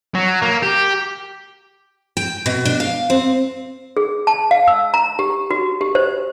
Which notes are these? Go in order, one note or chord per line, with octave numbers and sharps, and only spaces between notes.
F#3
A#3
G4
G5
B2
D4
F5
C4
G#4
A5
F5
E6
A#5
G4
F#4
G4
C5